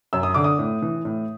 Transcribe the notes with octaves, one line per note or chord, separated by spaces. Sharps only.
F#2 E6
D#6
D3 D6
D#6
A2
E3
A2